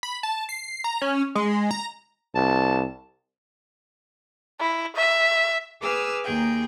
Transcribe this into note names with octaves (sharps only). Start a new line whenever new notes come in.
B5
A5
C7
A#5
C#4
G#3
A#5
C2 A5
E4
E5
G#4 B4 D6 E6 F6
D#2 G#4 G5